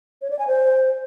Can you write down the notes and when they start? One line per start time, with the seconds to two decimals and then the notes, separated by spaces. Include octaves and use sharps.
0.22 C#5
0.30 D5
0.39 G#5
0.48 C5